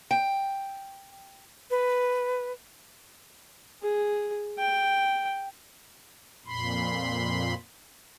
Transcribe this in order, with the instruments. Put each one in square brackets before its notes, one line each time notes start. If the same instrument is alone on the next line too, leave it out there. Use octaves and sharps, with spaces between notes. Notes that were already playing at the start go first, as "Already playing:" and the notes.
[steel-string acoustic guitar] G5
[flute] B4
[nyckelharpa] G#4
G5
[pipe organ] F2 A#2 B5 C6